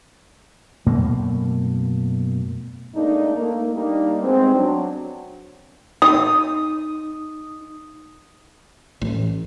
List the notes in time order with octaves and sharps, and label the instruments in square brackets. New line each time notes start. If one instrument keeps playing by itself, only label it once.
[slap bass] F#2 B2 A3 A#3
[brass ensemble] G#2 A3 A#3 D4 D#4
A3 A#3
G3 A#3 D4 D#4
G3 G#3 B3 C4
F#3 D4
[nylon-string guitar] D#4 [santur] D#6
[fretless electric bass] A1